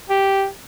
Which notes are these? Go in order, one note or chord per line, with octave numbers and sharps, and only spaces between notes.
G4